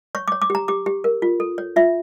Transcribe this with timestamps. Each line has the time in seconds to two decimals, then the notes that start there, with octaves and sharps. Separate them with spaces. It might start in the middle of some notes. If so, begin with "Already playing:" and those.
0.15 C#5 C#6
0.28 C#5 D6
0.42 D6
0.50 G4 A#5
0.68 G4 D6
0.86 G4
1.04 A#4
1.22 F4
1.40 A4
1.58 C#5
1.76 F4 E5